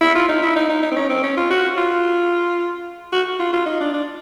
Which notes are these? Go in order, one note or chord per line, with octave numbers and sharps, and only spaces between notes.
E4
F4
D#4
E4
D#4
D#4
D#4
C4
C#4
C4
C#4
F4
F#4
F4
F#4
F4
F4
D#4
D4
D4